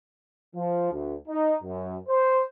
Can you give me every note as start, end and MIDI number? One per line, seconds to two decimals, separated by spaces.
0.56 0.90 53
0.92 1.15 38
1.28 1.55 63
1.63 1.96 42
2.09 2.42 72